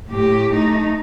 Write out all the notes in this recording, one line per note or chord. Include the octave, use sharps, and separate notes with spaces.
A2 G4
A3 D#4